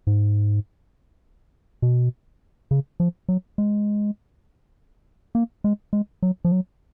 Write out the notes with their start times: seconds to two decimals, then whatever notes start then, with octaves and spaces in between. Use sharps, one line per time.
0.07 G#2
1.82 B2
2.71 C#3
3.00 F3
3.29 F#3
3.58 G#3
5.35 A#3
5.64 G#3
5.93 G#3
6.22 F#3
6.45 F3
6.52 F#3